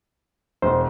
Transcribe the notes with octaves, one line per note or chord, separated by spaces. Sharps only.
E1 C5